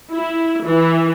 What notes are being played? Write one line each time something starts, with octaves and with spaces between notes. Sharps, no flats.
E4
E3